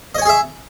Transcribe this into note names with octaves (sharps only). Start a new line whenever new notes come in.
G#4 C#5 D#5 E5 G#5